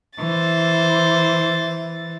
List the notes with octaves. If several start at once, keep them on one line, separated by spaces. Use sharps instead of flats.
E3 C5 A6